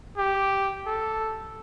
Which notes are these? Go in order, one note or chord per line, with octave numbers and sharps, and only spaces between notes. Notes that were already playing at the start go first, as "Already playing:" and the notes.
G4
A4